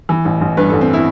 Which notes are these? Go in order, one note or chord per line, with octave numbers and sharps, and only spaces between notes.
E3
A1
A1
G2 B4
A1 A4
C4
E4